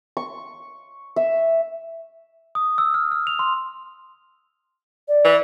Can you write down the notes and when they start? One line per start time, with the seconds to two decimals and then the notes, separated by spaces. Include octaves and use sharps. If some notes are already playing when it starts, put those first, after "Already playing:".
0.17 C#6
1.16 E5
2.55 D#6
2.78 E6
2.94 F6
3.12 F6
3.27 F7
3.39 C6
5.08 D5
5.25 E3